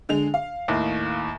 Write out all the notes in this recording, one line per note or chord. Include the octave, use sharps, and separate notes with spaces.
D3 G#3 F7
F5
D#2 A2